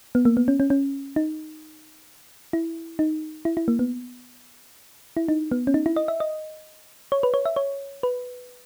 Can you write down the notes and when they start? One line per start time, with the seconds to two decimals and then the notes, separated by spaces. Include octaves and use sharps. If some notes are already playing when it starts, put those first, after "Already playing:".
0.15 B3
0.25 A#3
0.37 B3
0.48 C#4
0.60 C#4
0.70 C#4
1.16 D#4
2.53 E4
2.99 D#4
3.45 E4
3.57 E4
3.68 A#3
3.79 B3
5.17 E4
5.28 D#4
5.52 B3
5.67 C#4
5.74 D#4
5.86 E4
5.96 D#5
6.08 E5
6.20 D#5
7.12 C#5
7.23 B4
7.34 C#5
7.45 E5
7.56 C#5
8.03 B4